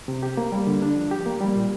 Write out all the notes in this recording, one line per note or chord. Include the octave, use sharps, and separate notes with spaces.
C3
G4
A#3
G3
D3
D4
F3
G4
A#3
G3
A#2